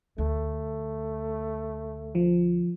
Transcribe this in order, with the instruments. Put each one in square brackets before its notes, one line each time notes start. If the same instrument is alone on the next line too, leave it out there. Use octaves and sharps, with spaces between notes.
[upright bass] D2 [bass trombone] A3
[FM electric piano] F3